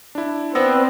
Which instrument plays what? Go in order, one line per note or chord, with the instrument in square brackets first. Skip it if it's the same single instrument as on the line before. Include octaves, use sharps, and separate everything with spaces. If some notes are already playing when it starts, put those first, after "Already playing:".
[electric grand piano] D4 E4
[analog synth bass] B3 [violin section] C4 [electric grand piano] D5 E6 A#6